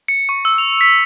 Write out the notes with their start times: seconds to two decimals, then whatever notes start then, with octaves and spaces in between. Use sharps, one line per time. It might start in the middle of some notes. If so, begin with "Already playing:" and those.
0.08 C#7
0.29 C#6
0.45 E6
0.58 F7
0.81 B6